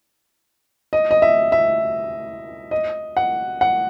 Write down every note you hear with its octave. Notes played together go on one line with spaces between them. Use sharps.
D#5
D#5
E5
E5
D#5
F#5
F#5